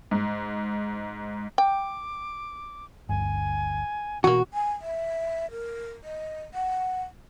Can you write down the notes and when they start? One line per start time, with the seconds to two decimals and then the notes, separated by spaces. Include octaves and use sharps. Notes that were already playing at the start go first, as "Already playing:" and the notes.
0.11 G#2
1.58 G5 D6
3.09 G1 D2 G2 G#5
4.24 B2 E3 F#3 A#3 F#4
4.54 G#5
4.81 E5
5.51 A#4
6.04 D#5
6.54 F#5